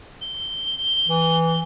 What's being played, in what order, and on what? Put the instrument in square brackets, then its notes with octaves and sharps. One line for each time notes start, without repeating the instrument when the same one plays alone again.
[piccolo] G7
[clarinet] E3